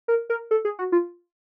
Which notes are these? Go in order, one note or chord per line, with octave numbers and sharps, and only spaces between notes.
A#4
A#4
A4
G#4
F#4
F4